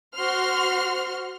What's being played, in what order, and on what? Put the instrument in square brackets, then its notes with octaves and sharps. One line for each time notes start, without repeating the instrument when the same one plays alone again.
[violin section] F#4 C5 C6 F6